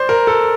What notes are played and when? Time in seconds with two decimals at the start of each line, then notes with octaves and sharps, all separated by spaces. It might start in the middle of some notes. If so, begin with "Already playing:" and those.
Already playing: C5 D5
0.09 A#4
0.27 A4